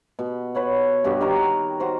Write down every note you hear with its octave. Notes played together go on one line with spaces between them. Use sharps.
B2
B4 C#5 F#5
G2 B2 F#4 G4
D#3 F#4 A#4
F#4 C5